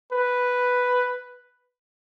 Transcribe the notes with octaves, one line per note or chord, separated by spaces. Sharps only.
B4